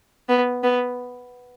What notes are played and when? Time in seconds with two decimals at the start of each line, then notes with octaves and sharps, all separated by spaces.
0.29 B3
0.63 B3